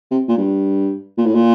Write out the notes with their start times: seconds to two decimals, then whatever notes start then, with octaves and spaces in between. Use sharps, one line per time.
0.11 C3
0.28 A#2
0.38 G2
1.18 A#2
1.26 A2
1.35 A#2